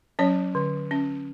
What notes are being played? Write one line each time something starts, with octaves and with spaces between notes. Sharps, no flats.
F#3 C#4 C#5
D3
C#4